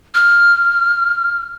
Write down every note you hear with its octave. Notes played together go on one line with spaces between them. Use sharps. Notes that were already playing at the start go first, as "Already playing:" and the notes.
F6